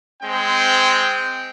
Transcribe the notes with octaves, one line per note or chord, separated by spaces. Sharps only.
G#3 C4 G5